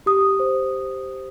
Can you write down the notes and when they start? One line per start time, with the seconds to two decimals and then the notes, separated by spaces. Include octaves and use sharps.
0.06 G4 D#6
0.40 C5